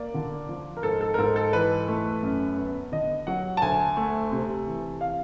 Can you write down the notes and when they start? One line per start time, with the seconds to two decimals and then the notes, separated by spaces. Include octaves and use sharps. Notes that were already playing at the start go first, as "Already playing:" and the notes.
Already playing: A#3 D5
0.14 D3
0.49 F3
0.77 A#4
0.83 G#2 A4
1.01 A4
1.14 A#4
1.18 G#2 A4
1.36 A4
1.53 E3 B4
1.88 A3
2.23 F#2
2.58 B3
2.92 D3 D#5
3.27 F#3 F#5
3.57 A5
3.62 D2 G#5
3.97 A3
4.31 C3
4.66 E3
5.01 F5